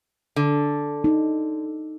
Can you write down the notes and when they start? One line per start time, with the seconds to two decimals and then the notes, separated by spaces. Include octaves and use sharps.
0.36 D3
1.04 D#4